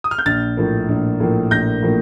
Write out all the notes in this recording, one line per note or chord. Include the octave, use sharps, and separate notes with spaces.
D#6
F6
G6
A#1 F6 A6
A2 F3 A#3
A#1
A2 F3 A#3
A#1 G6 A#6
A2 F3 A#3